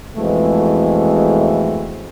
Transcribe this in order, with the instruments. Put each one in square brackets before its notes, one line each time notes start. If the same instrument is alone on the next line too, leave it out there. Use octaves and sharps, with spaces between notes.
[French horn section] F2 B2 E3 G#3 A3